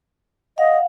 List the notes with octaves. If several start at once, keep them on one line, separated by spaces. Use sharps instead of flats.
D#5 F5 F#5